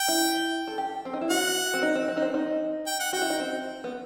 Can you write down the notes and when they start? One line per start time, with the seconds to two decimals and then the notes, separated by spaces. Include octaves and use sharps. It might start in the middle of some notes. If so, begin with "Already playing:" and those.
Already playing: G5
0.08 E4
0.68 A4
0.78 G4
1.05 C4
1.13 D#4
1.21 E4
1.30 F#4 F#5
1.74 C4
1.83 D#4
1.95 C4
2.08 C4
2.17 D#4
2.22 C4
2.34 D#4
2.87 G5
3.00 F#5
3.13 F#4 G5
3.22 E4
3.30 D#4
3.40 C4
3.84 B3